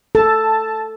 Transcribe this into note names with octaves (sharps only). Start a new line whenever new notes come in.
A4 A5